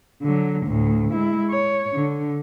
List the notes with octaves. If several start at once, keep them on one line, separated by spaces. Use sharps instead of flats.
D3 F#3
D2 A2
G#3 E4
C#5
D3